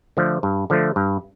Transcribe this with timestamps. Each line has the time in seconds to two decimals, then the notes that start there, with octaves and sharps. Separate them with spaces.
0.17 D3 F3 A3
0.43 G2
0.70 D3 F3 A3
0.96 G2